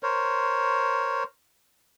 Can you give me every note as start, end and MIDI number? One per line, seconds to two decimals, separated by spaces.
0.03 1.23 70
0.03 1.23 72
0.03 1.23 73